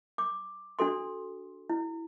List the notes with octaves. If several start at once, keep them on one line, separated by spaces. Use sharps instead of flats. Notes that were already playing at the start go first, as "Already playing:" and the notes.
D6
D4 F#4 A4 C6
E4